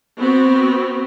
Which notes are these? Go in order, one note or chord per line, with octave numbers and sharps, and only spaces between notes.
B3 C4 F#4